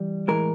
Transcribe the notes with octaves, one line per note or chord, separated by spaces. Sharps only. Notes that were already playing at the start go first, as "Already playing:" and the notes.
Already playing: E3 G3
A2 E3 G#3 A#4